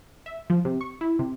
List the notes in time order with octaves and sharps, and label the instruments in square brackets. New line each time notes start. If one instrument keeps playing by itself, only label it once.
[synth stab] E5
F3
C3
C#6
E4
C3